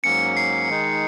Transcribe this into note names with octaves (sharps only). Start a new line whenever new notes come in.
G#2 F#3 A#3 C#4 C#7
C7
D#3 G#3 D#4